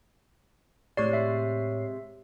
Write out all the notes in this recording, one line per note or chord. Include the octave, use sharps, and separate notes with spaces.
A2 C3 G#3 C#5 D5 C7
E5